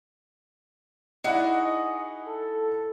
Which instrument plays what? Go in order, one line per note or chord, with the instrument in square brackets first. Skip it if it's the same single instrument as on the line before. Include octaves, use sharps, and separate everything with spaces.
[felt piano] D#4 E4 F#5 [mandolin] F#4 G#4 [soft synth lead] D5
[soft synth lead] D#5
A4